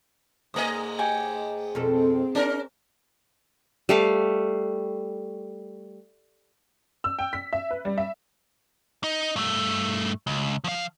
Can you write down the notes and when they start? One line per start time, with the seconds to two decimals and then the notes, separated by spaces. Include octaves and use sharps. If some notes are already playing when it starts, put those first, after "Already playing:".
0.54 G#2 A3 D#5 G#5 A#5 D#6
0.99 G4 C#5 G#5
1.75 F2 B2 C4 A4
2.35 C#4 D#4 A#4
3.89 G3 A3 F5
7.04 E6
7.19 G5
7.33 B6
7.53 E5
7.71 B4
7.85 G3
7.98 E5
9.04 D#4
9.36 G2 A3
10.27 C#2
10.64 F3 F5